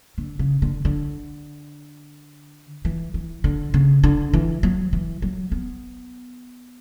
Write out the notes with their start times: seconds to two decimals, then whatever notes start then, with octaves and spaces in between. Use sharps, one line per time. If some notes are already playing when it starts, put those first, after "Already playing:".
0.18 D3
0.39 C#3
0.62 D3
0.85 D3
2.85 E3
3.14 E3
3.44 D3
3.74 C#3
4.04 D3
4.33 E3
4.63 F#3
4.93 E3
5.22 F#3
5.52 B3